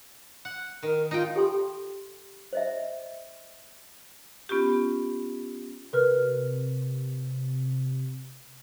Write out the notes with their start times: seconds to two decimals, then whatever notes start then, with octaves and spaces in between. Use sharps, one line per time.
0.45 F#5
0.83 D#3 A#4
1.11 D#4 F4 G5
1.36 G4 A4 G5 C6
2.53 C5 D#5 E5
4.49 B3 C#4 F4 G4
5.93 C3 A#4 B4 F6